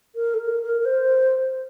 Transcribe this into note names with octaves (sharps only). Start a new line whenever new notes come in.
A#4
A4
A#4
A#4
A#4
C5